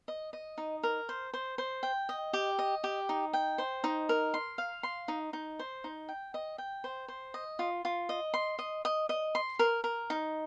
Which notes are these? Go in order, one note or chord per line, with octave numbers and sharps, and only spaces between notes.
D#5
D#5
D#4
A#4
C5
C5
C5
G5
D#5
G4
D#5
G4
D#4
G5
C5
D#4
A#4
C6
F5
C6
D#4
D#4
C5
D#4
G5
D#5
G5
C5
C5
D#5
F4
F4
D#5
C6
D#5
D#5
D#5
C6
A#4
A#4
D#4